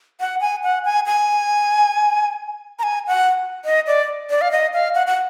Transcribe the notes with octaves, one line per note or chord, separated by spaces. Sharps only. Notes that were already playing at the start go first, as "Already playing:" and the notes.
F#5
G#5
F#5
G#5
G#5
A#5
G#5
F#5
D#5
D5
D5
F5
D#5
F5
F#5
F#5